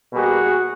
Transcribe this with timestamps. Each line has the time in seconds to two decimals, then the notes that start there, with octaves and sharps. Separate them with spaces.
0.13 B2 G3 A#3 F#4 G#4